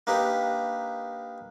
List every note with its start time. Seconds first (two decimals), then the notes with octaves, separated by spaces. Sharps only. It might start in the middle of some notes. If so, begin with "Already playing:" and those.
0.07 A#3 D4 D#4 G4 B4